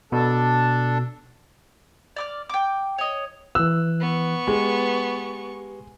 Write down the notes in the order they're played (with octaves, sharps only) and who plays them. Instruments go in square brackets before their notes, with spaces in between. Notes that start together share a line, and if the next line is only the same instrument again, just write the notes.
[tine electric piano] B2 [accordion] D4 A4
[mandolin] D5 D6 F6
G5 D6
C#5 D#5
[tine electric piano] E3 F#6 [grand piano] E6
[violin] B3 C#6
[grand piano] G#3 [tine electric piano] G4 B4